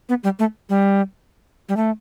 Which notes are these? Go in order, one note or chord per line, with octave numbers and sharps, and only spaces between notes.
B3
G3
A3
G3
G3
A3